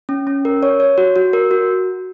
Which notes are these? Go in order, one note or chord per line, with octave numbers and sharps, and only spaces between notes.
C#4
C#4
A#4
C#5
C#5
F#4
F#4
A#4
F#4